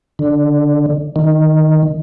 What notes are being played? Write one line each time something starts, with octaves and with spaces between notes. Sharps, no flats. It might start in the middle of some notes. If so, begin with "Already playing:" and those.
D3
D#3